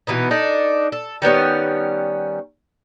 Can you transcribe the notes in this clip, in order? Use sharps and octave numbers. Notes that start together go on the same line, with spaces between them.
B2 E3 B3 D#4
D4 D#4 A4
A4
D#3 G3 B3 C#4